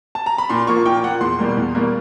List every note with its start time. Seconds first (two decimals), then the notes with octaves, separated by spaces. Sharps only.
0.15 A5
0.26 A#5
0.38 B5
0.50 A#2 C6
0.67 F3 A#3 C#6
0.86 A#2 G5
1.03 F3 A#3 F#5
1.21 E2 C6
1.39 B2 G3 A#3
1.57 E2
1.75 B2 G3 A#3